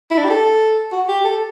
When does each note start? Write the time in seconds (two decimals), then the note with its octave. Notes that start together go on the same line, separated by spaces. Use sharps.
0.11 E4
0.18 D4
0.25 G4
0.30 A4
0.92 F#4
1.08 G4
1.25 A4